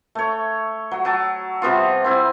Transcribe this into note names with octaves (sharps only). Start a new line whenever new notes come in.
A3 C#5
F#3
F#3 A5
C3 G3 B3 F4
C4 E4 G#5